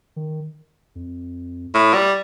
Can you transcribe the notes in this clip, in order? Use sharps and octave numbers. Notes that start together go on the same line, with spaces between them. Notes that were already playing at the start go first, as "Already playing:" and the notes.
D#3
F2
A2
G3